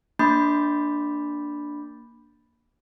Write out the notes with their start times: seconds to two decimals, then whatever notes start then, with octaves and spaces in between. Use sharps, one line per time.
0.19 A#3 D4 B5 D6 G6 A6